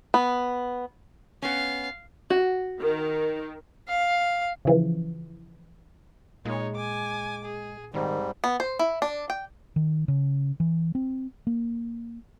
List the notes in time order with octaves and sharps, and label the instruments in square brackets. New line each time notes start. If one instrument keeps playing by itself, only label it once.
[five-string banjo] B3
[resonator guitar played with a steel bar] B3 C#4 [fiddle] F5
[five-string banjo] F#4
[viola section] D#3
[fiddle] F5
[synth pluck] C#3 E3 F3
[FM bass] A#2 [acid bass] G#3 [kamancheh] D#4 C#5
[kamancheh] G#5 D6
G#4
[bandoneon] G#2 G3 [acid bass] D#3 [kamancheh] C4
[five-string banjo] B3
C5
E4
D4
G5
[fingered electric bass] D#3
C#3
E3
C4
A#3